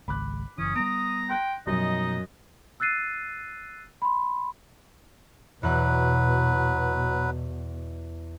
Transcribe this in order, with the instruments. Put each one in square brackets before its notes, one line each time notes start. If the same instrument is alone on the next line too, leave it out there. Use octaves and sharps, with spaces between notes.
[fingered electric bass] G#1 C#2 [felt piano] B5 D6 F#6
[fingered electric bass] F#1 E3 [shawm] C#4 [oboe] D#6
[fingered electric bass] G3 B3 [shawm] A#5 [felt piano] D7
[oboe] G5 [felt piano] C6 F#6 A#6
[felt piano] F#2 [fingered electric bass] B2 F3 G3 [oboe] D#4 [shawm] D#5
[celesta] E6 F#6 A6 C7 D#7
B5 C6
[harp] E2 F#6 [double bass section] B2 [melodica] F#3 B4